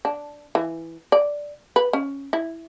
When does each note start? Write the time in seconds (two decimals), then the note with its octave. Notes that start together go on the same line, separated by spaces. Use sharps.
0.05 D4
0.55 E3
1.12 D5
1.76 B4
1.93 C#4
2.33 E4